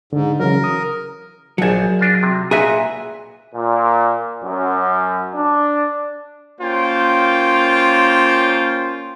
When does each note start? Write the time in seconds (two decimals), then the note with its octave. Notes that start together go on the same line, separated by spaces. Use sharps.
0.13 G#2 D3
0.40 C#3 E3 F#3 A#4
0.64 D#6
1.58 A#1 F#3 G#4 A5
1.99 D4 F4 D#5
2.23 C3
2.51 A#2 F#4 G#4 B4 E5
3.54 A#2
4.44 F#2
5.34 D4
6.61 A#3 C#4 F4 C5 G5